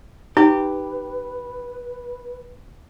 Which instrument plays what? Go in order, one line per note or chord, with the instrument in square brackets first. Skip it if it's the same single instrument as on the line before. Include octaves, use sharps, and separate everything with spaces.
[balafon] D#4 [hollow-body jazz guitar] G4 [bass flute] B4